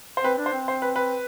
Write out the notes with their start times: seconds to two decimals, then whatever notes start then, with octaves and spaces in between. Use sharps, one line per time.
0.17 C5
0.24 C4 B4
0.38 D4
0.46 C5
0.52 C4
0.68 C5
0.82 B4
0.96 B4